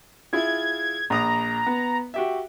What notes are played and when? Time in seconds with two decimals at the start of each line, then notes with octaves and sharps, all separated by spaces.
0.33 E4 F4 G#4 G#6
1.10 A#1 A#5 D#6
1.67 B3
2.14 F#4 G4 E5